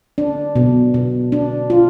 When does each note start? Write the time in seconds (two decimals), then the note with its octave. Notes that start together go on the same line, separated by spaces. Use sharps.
0.18 D4
0.55 B2
0.94 B2
1.32 D4
1.70 F4